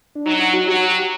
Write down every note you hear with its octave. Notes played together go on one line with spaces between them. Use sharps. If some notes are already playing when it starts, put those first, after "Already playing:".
D4
F#3 D#4
D#4
F#4
F#3 G4